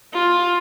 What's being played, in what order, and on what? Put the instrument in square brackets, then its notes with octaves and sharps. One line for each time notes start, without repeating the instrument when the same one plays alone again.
[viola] F4